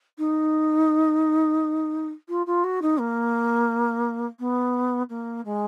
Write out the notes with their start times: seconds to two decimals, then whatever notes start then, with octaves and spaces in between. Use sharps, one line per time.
0.18 D#4
2.28 F4
2.46 F4
2.63 F#4
2.82 D#4
2.99 A#3
4.39 B3
5.09 A#3
5.45 G#3